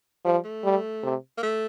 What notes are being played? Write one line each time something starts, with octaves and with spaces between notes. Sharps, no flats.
F3 G3
A3
G3
C3
A#3
A3